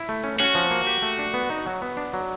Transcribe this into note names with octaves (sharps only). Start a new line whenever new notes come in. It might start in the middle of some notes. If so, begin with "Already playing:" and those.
Already playing: E4
A3
C#4
C#4 F#4
F3
A#3
G4
A3
D4
B3
D#4
F#3
B3
D4
F#3